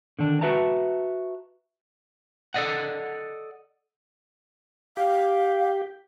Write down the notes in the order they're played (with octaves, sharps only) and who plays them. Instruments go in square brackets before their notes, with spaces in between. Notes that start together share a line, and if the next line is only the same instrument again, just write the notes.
[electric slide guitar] D3 D#3 D4
F#4 B4 E5 A5 A#5
[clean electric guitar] A4 A#4 D5 D#5 F#5
[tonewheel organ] G4 [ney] F5